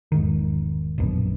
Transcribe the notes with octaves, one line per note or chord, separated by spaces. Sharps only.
E1 G#2 D#3
D1 A#1 F#2 B2